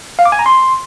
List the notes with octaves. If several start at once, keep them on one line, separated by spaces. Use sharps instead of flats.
F5
D6
G#5
A#5
C6